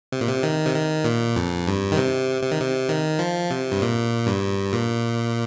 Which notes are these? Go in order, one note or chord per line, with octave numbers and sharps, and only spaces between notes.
C3
A#2
C3
D#3
C3
D#3
A#2
F2
G2
D#3
C3
C3
D#3
C3
D#3
F3
C3
G2
A#2
G2
A#2